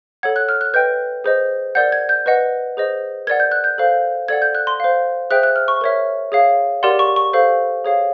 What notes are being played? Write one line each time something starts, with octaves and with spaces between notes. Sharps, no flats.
A4 C#5 F#5 G#6
F#6
F6
F#6
B4 D#5 G5 G6
G#4 C5 D#5
A#4 D5 F#5 G6
G#6
G6
B4 D#5 F#5
G#4 C5 D#5
A#4 D5 F#5 G#6
G6
F#6
G6
A4 C5 F5
A4 D5 F#5 G#6
G6
F#6
C6
C5 F5
G#4 C5 E5 G5 F#6
F#6
F6
C#6
A#4 C#5 E5
G#4 C#5 F5
G4 A#4 D5 F#5 C6
C#6
C#6
A4 C5 F5
G#4 C#5 F5